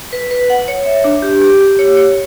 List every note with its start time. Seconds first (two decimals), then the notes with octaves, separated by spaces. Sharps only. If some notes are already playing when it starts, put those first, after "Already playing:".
0.13 B4
0.31 B4
0.50 F#5
0.68 C#5
0.85 E5
1.04 D4
1.22 G4
1.42 G4
1.61 G4
1.79 C#5
1.97 C#5